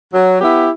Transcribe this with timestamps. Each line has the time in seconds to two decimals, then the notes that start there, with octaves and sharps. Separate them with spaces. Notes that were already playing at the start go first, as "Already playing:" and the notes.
0.13 F#3
0.41 B3 E4 G4